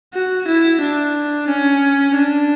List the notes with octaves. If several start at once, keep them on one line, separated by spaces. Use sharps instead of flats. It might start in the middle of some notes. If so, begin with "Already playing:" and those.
F#4
E4
D4
C#4
D4